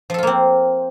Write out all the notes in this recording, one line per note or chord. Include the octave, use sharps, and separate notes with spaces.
F3 A#3 C4 F4 A4